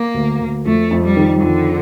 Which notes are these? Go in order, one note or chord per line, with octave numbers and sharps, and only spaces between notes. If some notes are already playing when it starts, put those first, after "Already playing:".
Already playing: A#3
D2
D2
F2 A3
F2
G3
D#3
F2 D3